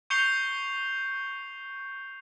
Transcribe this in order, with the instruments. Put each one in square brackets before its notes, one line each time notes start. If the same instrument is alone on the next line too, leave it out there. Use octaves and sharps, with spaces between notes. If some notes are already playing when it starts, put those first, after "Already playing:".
[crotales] C#6 G6 C7 C#7 F7 G7